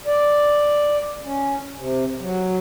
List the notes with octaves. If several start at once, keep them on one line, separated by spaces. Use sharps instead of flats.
D5
C#4
C3
F#3